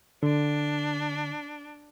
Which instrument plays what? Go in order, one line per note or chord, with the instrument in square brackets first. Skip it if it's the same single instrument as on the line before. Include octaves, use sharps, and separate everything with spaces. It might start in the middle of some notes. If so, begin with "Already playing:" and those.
[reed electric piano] D3 [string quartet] D4